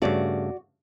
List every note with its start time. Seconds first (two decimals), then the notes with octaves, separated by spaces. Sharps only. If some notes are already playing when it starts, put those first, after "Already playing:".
0.02 G2 C#3 A3 F#4 D5